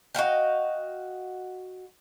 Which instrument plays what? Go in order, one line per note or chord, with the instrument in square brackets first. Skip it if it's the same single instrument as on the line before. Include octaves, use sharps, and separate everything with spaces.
[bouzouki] F#4 D#5 F5 G5